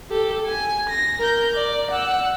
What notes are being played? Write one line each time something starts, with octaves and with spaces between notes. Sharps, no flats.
G4 A4
G#5
A#6
A#4 G6
D5
F#5 E6